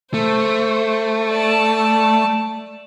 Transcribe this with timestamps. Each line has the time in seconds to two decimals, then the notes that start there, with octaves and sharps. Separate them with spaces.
0.14 A3 C5
1.30 D5 A5